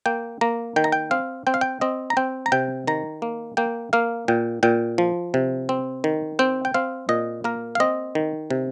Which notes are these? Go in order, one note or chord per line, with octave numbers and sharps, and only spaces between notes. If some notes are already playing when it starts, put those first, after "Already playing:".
A#3 G5
A#3 A#5
D#3 G5
A#5
G5
C4 F5
C4 G5
F5
G5
C4 D#5
A#5
C4 G5
A#5
C3 G5
D#3 A#5
A#3
A#3 G5
A#3 F5
A#2 G5
A#2 G5
F3
C3
C4
D#3
C4 G5
G5
C4 F5
A#2 D#5
A#3 A#4
F5
C4 D#5
D#3
C3